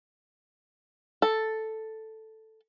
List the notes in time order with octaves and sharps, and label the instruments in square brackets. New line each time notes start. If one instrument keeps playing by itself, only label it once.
[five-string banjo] A4